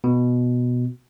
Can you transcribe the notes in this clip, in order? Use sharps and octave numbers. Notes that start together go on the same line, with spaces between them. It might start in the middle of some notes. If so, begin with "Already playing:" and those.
B2